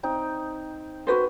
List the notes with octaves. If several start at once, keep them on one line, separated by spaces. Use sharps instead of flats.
C4 D#4 G5
F#4 B4 C5